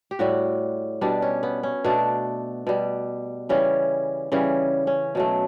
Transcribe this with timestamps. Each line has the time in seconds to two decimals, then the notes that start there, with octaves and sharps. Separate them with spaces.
0.11 G4
0.19 A2 G3 F#4
1.01 B2 G3 D4
1.22 C#4
1.43 B3
1.63 C#4
1.84 B2 A3 D4
2.67 B2 G3
3.49 C#3 E3 G3 C#4
4.32 C#3 E3 G3 C#4
4.87 C#4
5.15 B2 F#3 A3